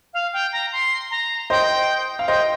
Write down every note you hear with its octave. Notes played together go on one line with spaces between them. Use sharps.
F5
G5
A#5
C6
A#5
C5 D#5 G5
F5
C5 D#5 G5